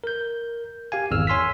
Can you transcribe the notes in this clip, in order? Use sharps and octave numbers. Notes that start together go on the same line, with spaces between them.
A#4 G6
G4 F5 G#5
G#1 E2 E6 F6
C#5 G#5 C6 E6 F6 B6